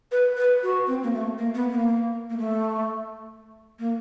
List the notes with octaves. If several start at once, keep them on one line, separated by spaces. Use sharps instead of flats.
B4
B4
F#4
C4
A#3
A3
A#3
B3
A#3
A#3
A3
A#3